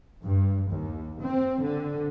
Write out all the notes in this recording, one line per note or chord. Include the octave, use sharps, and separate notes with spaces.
G2
D#2
C4
D3